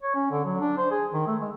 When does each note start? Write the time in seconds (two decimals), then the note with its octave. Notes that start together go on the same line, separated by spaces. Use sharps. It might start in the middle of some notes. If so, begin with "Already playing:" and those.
0.02 C#5
0.15 C#4
0.31 D3
0.45 F#3
0.60 D4
0.78 C5
0.91 G#4
1.13 D#3
1.27 A3
1.41 G#3